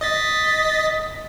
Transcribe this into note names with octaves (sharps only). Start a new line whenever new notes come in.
D#5 A6 B6